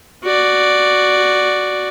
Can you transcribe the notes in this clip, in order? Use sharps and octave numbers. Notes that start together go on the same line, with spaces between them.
F#4 D5